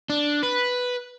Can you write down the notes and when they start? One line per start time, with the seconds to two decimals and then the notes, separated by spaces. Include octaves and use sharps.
0.10 D4
0.43 B4